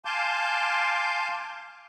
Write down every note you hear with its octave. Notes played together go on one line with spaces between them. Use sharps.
F5 G#5 A5 C6 D6 G6